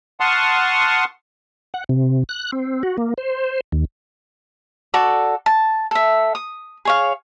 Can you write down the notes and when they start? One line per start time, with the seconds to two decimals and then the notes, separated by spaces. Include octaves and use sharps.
0.20 F#5 A5 C6 C#6 D#6 F6
1.74 F#5
1.89 C3
2.29 F#6
2.52 C4
2.83 F#4
2.98 A#3
3.18 C5
3.72 D#2
4.94 F#4 A4 D5
5.46 A5
5.91 A4 E5
6.35 D#6
6.85 G#4 C#5 F5